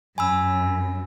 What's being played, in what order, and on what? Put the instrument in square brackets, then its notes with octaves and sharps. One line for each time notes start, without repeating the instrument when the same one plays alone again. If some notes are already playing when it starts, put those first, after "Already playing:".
[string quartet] F#2 [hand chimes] G#5 B5 E6